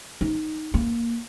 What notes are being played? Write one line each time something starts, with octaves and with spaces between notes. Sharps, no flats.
D#4
A#3